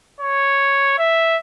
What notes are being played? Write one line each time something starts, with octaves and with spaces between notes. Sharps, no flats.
C#5
E5